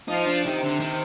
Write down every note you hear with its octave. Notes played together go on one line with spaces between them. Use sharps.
F3 D#4
D4
C3 D#3
D3
D#3